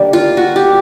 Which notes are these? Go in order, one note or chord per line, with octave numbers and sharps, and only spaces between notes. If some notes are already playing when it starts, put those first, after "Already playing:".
Already playing: D3 G3 A#3
F4
F#4
G4